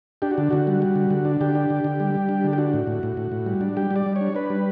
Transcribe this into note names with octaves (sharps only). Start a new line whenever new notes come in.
D4 G4
F#4
D3
D3 F#4
G3
G3
D3
D3
D4
D3 G4
D4
D3
D3
G3
G3
D4
D3
G4
D4 F#4
A2
A2
A2
A2
A2
G3
D4
G3 G4
G3
D5
G3
C#5
D4
D4 B4
G3